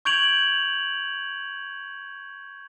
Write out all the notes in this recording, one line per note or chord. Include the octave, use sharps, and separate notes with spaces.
C#6 G6 G#6 D7 F7 F#7